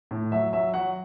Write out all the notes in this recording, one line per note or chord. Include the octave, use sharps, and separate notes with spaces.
A2
F#3 E5
F#3 E5
F#3 F#5